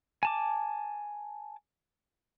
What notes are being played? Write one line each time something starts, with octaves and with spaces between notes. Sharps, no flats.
G#5 A5 D6